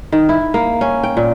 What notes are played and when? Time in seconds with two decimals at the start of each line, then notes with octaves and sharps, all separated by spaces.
0.12 D#3
0.29 E4
0.54 A#3
0.81 C#4
1.03 G5
1.17 A#2